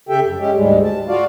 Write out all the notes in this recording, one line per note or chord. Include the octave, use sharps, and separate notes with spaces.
C#3 G4 A4 E5 G5
F#2
G#3 C#4 G4
D2 G#2 G3 G#3
A5
F4 F#4 D5 F5